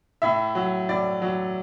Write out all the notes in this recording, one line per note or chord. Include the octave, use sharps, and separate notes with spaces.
A2 E5
F#3
A2 D5
F#3